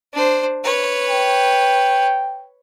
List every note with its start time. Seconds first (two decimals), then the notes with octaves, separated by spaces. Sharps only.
0.13 D4 C5
0.64 B4 C#5
1.09 G5